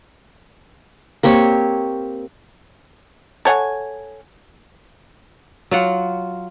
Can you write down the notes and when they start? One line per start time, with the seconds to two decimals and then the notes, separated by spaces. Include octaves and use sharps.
1.23 A#3 C4 G4 C#5
3.45 A4 C#5 F#5 G#5
5.71 F#3 F4 F#5